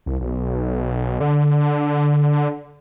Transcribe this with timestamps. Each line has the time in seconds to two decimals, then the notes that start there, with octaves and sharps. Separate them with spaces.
0.06 C2
0.21 B1
1.20 D3